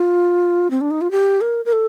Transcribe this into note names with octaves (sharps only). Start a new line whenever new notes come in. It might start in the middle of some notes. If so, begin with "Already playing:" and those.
Already playing: F4
C4
D4
D#4
F4
G4
A#4
A#4
A4